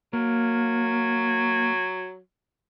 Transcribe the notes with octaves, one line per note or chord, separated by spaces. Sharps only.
F#3 A#3